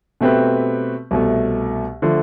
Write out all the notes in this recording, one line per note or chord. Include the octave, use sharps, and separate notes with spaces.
B2 A3 C4 G4 B4
C2 B2 A3
D3 F3 A3